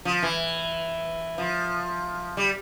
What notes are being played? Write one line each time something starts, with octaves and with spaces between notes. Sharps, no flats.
F3
E3
F3
G3